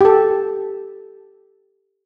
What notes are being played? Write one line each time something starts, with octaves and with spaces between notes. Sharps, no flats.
G4 A4